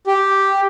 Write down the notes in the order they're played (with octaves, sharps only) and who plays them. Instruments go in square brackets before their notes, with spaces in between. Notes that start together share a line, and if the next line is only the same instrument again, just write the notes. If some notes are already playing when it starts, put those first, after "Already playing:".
[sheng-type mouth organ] G4